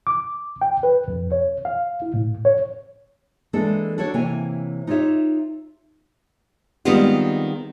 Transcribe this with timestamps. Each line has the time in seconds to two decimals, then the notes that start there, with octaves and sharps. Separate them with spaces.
0.07 D6
0.61 G5
0.83 B4
1.08 F2
1.32 C#5
1.65 F5
2.02 E4
2.14 A2
2.45 C#5
3.53 E3 G#3 A#3 D4 A4
3.98 D4 F#4 A4 C#5
4.14 C3 E3 A#3 C#5 G5 G#5
4.87 D#4 F4 G4 C#5 E5
6.85 D#3 G3 G#3 B3 C4 F4